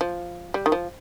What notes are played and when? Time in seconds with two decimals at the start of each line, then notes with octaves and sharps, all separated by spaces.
0.01 F3
0.54 G3
0.66 D#3
0.72 F3